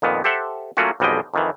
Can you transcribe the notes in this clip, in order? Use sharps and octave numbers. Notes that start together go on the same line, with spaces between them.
F2 A#2 D#3 B3
G4 A4 C5 E5 F#5
F#3 A3 A#3 C#4 F4 F#4
B1 F2 G3 G#3 D#5 G5
F2 D#3 E3